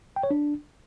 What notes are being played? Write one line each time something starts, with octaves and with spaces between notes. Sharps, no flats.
G5
C#5
D4